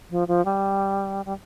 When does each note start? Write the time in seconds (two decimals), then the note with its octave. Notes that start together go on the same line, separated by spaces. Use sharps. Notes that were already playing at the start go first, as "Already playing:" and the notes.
0.11 F3
0.28 F3
0.45 G3
1.26 G3